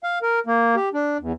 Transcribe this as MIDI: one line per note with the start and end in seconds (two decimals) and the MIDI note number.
0.04 0.19 77
0.22 0.39 70
0.46 0.75 58
0.76 0.89 67
0.93 1.17 62
1.20 1.32 40